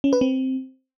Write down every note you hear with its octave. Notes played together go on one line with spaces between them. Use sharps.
C#4
B4
C4